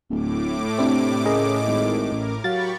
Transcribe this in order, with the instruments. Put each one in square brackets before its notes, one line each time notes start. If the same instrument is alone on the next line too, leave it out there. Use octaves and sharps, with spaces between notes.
[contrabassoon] D1 [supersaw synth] A2 D6
[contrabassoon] C3 [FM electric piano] C4 D4 E4
[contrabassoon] C#3 [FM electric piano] G#4 A#4 D#5
[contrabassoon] G#1
[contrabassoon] A1 [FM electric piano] A2 [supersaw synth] A#4
[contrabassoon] F#3 [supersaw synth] G4 B5 C#6 [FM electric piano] F5 A6